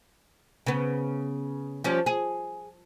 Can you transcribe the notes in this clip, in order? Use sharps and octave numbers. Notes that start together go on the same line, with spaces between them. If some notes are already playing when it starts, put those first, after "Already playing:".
C#3 B3
F3 G3 C#4
G#4